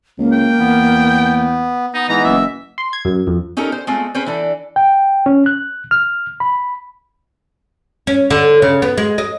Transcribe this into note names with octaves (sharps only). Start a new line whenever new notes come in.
C#2 A#3
G5
E2 B3
B3 D#4
G#2 E3 B3 D#5 A#5
F#1 E5
C6
G#6
F#2
F2
C#4 D#4 G4 A4 A#4
C5
G#3 A3 C4 F4
C4 C#4 G#4 B4 C5
E3 D4 A4
G5
C#4
F#6
F6
B5
C#4
D3
C#3
B3
G#3
D#5